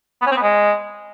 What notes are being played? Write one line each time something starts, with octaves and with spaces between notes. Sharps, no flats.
B3
C#4
C4
B3
G#3